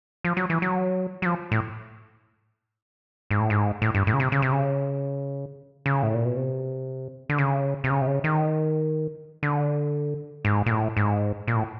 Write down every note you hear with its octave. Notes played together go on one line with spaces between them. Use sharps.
F3
F#3
E3
F#3
F#3
F3
A2
G#2
A2
G#2
A2
G2
A2
C#3
C3
C#3
C3
C#3
C#3
A2
A#2
B2
C3
D3
C#3
C3
C#3
C3
C#3
D#3
D3
G#2
A#2
A2
G#2
A#2
A2